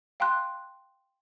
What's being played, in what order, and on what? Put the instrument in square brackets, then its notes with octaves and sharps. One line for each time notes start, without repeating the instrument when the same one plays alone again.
[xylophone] F5 G5 A#5 C6 F#6